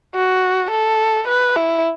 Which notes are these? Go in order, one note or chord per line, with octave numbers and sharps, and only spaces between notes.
F#4
A4
B4
E4